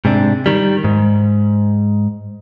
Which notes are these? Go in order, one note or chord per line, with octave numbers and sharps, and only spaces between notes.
G#2 C3 D4
D#3 G3
G#2